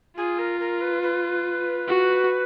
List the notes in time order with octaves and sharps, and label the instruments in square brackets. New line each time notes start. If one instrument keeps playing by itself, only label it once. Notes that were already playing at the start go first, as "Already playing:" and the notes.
[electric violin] F4 [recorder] G#4
[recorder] A#4
A#4
B4
B4
[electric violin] F#4